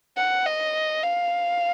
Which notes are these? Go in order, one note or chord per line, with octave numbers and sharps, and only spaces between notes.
F#5
D#5
F5